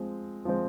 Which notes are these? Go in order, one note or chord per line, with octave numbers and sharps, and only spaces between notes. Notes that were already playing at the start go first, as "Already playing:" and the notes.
Already playing: F3 G#3 C4
F3 G#3 C4